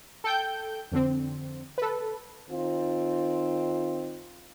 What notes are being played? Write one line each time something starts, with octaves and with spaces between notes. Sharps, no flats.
A4 G5 G6
F2 D3 C4
A4 B4
D#3 C4 D#4 F4